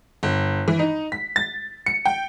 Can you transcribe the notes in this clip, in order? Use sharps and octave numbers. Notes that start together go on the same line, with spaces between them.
G1
E3
D#4
B6
A6
C#7
G5